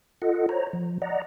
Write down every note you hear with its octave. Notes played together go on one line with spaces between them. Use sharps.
F4 A4 D#5 F#5
C5 C#5 A#5
F3
D5 D#5 F#5 A#5